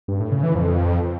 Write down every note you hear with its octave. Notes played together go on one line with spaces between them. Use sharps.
G2
A2
C#3
E3
F2